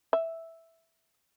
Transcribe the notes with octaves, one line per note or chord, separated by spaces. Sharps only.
E5